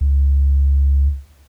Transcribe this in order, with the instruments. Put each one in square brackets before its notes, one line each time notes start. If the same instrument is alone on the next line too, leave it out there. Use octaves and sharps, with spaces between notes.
[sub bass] C#2